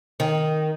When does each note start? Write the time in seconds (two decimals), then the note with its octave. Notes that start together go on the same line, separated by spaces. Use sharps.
0.20 D#3